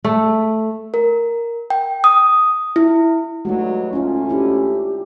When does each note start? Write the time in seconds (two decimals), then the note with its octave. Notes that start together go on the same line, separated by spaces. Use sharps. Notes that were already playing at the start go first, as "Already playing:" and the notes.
0.04 A3
0.94 A#4
1.70 G5
2.04 D#6
2.76 E4
3.45 G2 F#3 G#3 A3 D#4 F#4
3.93 D2 C#4 D#4 F4
4.29 D4 E4 G4